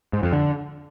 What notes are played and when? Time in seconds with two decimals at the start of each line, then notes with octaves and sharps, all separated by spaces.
0.13 G#2
0.23 F2
0.33 D3